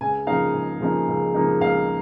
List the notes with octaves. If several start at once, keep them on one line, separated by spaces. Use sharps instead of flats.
C#2 G#5
C#3 F3 A#3 D#4 F5
C#2
C#3 F3 A#3 D#4
C#2
C#3 F3 A#3 D#4
C#2 F5